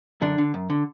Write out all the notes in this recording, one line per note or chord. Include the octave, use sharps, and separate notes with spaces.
F#2 D3 D4
D3
F#2
D3